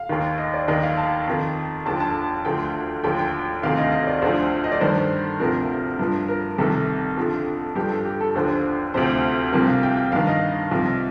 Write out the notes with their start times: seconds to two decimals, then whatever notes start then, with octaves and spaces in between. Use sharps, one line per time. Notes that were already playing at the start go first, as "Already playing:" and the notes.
Already playing: F5
0.09 D#2 D#3
0.38 D#5
0.54 D5
0.68 D#2 D#3 D#5
0.83 F5
0.97 A5
1.27 F2 D#3
1.85 D#2 D3 F3 A5
2.00 A5
2.45 D2 D3 F3 G5
3.04 D#2 D3 F3 G5
3.19 G5
3.63 D2 C3 D#3 F5
3.77 D#5
3.92 D#5
4.07 D5
4.22 D2 D3 F3 C5
4.64 D#5
4.72 D5
4.81 G2 D#3 C5
5.40 D2 C3 F3 A#4
5.99 G2 F3
6.28 A#4
6.58 C2 C3 D#3 A4
7.17 F2 D3 F3
7.76 G2 F3 G4
7.91 A4
8.05 G4
8.21 A4
8.35 D#2 D3 F3 C5
8.94 D2 C3 F3 C5
9.53 C2 C3 F3 A#4
9.68 F5
9.83 G5
9.97 G5
10.12 G2 D#3 F5
10.27 D#5
10.71 C2 C3 F3